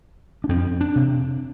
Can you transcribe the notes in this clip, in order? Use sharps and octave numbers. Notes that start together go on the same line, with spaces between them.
D4
F2 C4
D4
C3